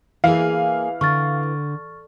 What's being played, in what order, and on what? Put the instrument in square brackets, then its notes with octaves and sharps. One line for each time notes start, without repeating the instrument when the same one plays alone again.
[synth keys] E3 [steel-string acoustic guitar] A#3 G#4 [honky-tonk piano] F5
[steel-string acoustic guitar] D3 [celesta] C#6 F6 A6